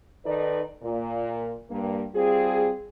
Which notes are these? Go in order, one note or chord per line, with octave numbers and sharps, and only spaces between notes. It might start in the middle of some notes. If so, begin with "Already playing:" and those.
D#3 D#4 A4 B4 D5 D#5
A#2
G2 A#3
G3 C4 F4 G#4